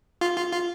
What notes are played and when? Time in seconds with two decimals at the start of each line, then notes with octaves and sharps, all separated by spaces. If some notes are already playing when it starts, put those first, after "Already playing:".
0.21 F4
0.37 F4
0.53 F4